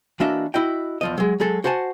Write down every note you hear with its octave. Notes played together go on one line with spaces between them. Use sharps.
E3 A#3 D4 F#4 D#5 E5
E4 F#4 D#5 G5
E2 F3 D#5
F#3 G#3
F#3 G#3 G#4 A4
F#4 C5 F#5 G#5 A5